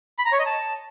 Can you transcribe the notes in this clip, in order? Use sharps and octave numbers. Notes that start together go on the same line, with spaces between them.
B5
A#5
C#5
D#5
A5